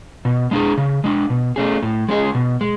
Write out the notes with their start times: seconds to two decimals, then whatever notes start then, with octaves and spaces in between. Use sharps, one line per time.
0.25 B2
0.51 G#3 D4 G#4
0.78 C#3
1.04 G#3 D4
1.30 B2
1.56 A3 C#4 G#4
1.83 A2
2.09 G#3 C#4 G#4
2.35 B2
2.61 G#3